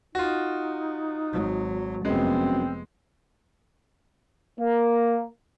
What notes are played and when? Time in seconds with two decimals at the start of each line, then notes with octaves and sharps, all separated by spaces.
0.15 D#4 F4 F#4
1.33 G#1 F#3
2.05 F1 F#2 G#3 B3 C4
4.59 A#3